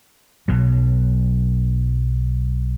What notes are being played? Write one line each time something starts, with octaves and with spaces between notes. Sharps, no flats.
B1 B2 F#3